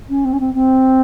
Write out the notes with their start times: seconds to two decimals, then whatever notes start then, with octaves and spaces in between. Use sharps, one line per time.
0.09 C#4
0.24 C4
0.32 C#4
0.39 C4
0.54 C4